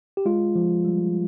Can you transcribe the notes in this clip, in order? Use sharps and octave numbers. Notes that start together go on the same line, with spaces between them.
G4
G#3 F4
F3
G3